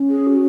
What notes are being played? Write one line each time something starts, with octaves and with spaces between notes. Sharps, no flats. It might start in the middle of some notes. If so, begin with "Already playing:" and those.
Already playing: C#4
G#4
F#4